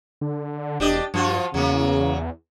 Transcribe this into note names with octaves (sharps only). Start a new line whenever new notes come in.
D3
E1 D4 G4 D#5
G2 F3 F4 F#4
E2 C#3 F#3 A#3